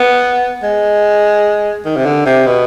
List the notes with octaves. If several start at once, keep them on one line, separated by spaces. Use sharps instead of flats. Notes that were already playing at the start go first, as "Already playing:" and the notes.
Already playing: B3
G#3
D#3
C3
D3
C3
B2